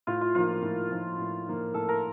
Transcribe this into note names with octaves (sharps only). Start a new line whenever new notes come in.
A2 F4
F4
F3 A#3 D#4 F4
A2
F3 A#3 D#4
A2
F3 A#3 D#4
A2 A4
A#4